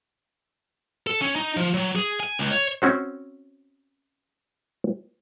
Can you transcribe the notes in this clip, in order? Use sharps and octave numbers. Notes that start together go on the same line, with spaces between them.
A4
C#4
D#4
F3
F#3
G#4
G#5
C#2
C#5
C4 C#4 F#4 C5